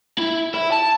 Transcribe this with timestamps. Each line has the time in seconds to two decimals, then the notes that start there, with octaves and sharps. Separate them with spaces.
0.18 E4
0.54 E4
0.72 A5